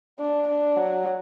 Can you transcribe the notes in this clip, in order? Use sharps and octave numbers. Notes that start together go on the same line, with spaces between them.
D4
D4
F#3